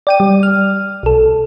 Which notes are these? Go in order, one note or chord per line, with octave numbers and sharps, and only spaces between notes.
D5 G5 D#7
G3
F6
B1 A4